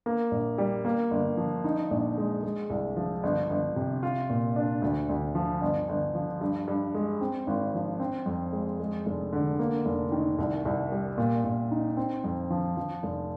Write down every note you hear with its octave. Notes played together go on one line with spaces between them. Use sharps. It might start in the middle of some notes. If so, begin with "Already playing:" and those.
A#3
A#1
G3
A#3
G1
F3
D#4
A#1
G#3
G#3
C2
F3
G1
G1
C3
F4
A#2
D4
D2
D2
F3
G1
G1
F3
G2
G2
G#3
C4
G#1
F3
C4
F2
G#3
G#3
F1
D3
A#3
F1
D#3
C2
C2
G3
A#2
A#2
D#4
C4
F2
F3
F3
F1